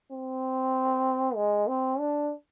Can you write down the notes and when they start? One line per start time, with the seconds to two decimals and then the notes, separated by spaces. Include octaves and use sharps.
0.11 C4
1.35 G#3
1.67 C4
1.99 D4